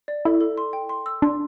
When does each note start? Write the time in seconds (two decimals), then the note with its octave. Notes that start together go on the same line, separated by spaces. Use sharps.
0.08 D5
0.25 E4 A4
0.41 A4
0.58 C6
0.73 G5
0.89 C6
1.06 E6
1.22 D4 C6